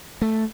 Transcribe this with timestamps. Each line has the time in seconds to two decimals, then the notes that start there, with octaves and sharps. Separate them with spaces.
0.22 A3